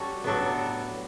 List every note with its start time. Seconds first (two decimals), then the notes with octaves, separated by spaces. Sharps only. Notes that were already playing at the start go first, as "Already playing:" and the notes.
Already playing: G3 C#4 F#4 A4
0.24 A2 F#3 B3 D4 A4